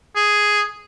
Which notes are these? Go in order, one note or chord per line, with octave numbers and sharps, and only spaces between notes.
G#4